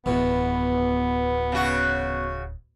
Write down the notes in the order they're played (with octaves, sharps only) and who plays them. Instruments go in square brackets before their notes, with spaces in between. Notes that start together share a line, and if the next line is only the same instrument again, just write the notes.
[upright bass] D1 [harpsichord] E2 B2 [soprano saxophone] B3
[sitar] C#3 F#4